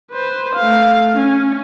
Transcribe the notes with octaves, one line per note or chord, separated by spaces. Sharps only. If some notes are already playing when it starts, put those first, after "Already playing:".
B4 C5
A3 F5
C#4